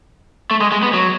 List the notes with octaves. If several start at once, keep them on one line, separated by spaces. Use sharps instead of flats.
A3
G#3
G#3
B3
F#3